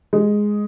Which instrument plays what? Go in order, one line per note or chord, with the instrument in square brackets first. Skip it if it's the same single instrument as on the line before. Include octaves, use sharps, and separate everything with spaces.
[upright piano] G#3